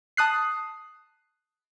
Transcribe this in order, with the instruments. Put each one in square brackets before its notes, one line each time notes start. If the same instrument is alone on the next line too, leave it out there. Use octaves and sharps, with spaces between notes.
[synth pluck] A5 D#6 F#6 C7